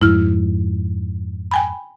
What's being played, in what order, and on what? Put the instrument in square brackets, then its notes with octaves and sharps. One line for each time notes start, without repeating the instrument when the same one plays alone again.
[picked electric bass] F2 G#2 [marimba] E4 F6
[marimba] G5 G#5 B5